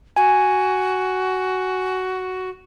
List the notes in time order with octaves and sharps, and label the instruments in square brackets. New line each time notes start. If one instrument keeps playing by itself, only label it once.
[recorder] F#4 [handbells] G#5